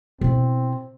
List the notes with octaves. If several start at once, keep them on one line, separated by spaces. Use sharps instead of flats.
B2 C4 E4